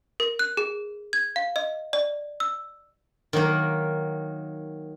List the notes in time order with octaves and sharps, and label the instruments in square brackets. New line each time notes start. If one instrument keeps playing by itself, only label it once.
[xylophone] A#4
F#6
G#4
G#6
F5
D#5
D5
E6
[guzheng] D#3 F#3 A#3